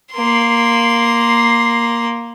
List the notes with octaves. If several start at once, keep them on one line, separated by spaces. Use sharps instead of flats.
A#3 C6